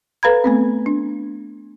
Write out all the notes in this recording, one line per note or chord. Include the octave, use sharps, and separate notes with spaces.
A4 B4 F5 A#5 B5 G#6
A3 B3 C4
D4